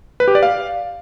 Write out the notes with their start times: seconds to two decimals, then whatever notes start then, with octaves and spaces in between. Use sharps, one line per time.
0.20 B4
0.28 G4
0.35 D5
0.43 F5